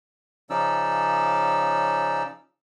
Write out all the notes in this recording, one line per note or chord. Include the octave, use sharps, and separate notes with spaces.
C#3 F3 C#4 D#4 D5 E6